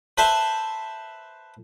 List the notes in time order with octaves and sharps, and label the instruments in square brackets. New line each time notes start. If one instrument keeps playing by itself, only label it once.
[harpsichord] B4 C5 E5 A5